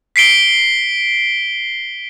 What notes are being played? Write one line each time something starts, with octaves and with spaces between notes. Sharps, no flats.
B6 C7 D7 G7